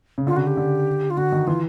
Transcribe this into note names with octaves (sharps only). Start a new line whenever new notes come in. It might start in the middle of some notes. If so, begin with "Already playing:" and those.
C#3
D3 F4
C#3 F#4
G4
D3
F4
D3 F#4
D#3
E3 F4